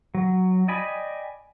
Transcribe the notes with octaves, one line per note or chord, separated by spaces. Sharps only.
F#3
D5 D#5 G5 G#5 B5